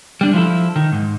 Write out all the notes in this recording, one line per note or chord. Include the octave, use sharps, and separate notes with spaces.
G3 D4
F3 E4 A4
D#3
G#2